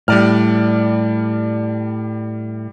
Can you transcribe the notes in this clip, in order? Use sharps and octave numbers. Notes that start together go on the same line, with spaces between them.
A2 G3 D5 F6